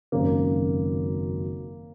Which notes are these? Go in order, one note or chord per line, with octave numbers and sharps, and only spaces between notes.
G#1 F#2 C#3 A#3